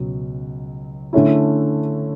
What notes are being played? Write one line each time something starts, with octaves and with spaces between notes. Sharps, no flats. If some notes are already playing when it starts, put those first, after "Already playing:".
Already playing: C#2 B2 F#3
D3 A3 C#4 E4